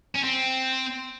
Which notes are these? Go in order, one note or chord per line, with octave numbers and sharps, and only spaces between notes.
C#4
C4